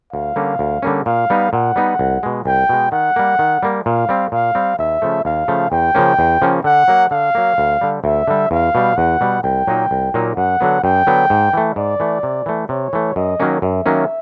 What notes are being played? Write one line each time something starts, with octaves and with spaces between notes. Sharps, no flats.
D2 F5
D3 G3 A#3 C#4
D2
D3 G3 A#3 C#4
A#2 F5
G3 B3 D#4
A#2 F#5
G3 B3 D#4
C2
B2 G#3
C2 G5
B2 G#3
D#3 F#5
G3 A#3
D#3
G3 A#3
A#2 F5
G3 C4
A#2 F5
G3 C4
D#2 E5
C#3 F3 A3
D#2 F5
C#3 F3 A3
E2 G5
C#3 F3 A#3 C#4
E2
C#3 F3 A#3 C#4
D3 F#5
F#3 A#3
D3 F5
F#3 A#3
D2
D3 G3
D2 E5
D3 G3
E2 F5
B2 G3
E2 F#5
B2 G3
C2 G5
A#2 F#3 A#3 D#4
C2
A#2 F#3 A#3 D#4
F#2 F#5
D3 F#3 B3
F#2 G5
D3 F#3 B3
G#2
E3 A3
G#2 D5
E3 A3
C3
E3 A3
C3 C#5
E3 A3
F#2 D#5
D#3 F#3 A#3 C#4
F#2 E5
D#3 F#3 A#3 C#4